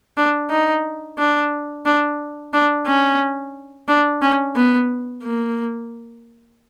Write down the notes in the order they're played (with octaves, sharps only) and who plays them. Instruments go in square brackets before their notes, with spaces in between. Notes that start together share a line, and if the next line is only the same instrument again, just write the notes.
[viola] D4
D#4
D4
D4
D4
C#4
D4
C#4
B3
A#3